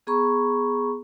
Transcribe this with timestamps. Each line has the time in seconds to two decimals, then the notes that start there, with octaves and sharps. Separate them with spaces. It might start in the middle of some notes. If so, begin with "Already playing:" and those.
0.07 B3 G#4 A#5 B5 C#6